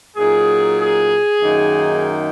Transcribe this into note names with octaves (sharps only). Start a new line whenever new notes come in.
A#2 F#3 D#4 G#4
G#4
F#2 D#3 A#3 D#4